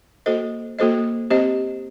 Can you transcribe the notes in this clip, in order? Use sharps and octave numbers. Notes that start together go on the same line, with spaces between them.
A#3 F#4 A4 C5 D#5
A#3 F#4 A4 C5 D#5
C4 G4 C5 D#5